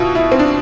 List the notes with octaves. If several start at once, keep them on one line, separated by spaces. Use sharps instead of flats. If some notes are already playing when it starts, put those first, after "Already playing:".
Already playing: B2 E4 F4
E4
C4
D4